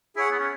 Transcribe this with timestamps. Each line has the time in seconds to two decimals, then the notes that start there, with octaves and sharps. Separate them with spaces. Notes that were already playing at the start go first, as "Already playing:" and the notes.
0.16 E4 G#4 C#5 F#5
0.31 B3
0.39 C#4